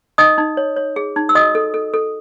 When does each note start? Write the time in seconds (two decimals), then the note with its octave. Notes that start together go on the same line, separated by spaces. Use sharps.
0.18 D#4 D#5 D#6
0.38 D#4
0.57 C#5
0.76 C#5
0.96 G#4
1.16 D#4
1.29 E6
1.35 F#4 D#5 D#6
1.55 A4
1.74 A4
1.94 A4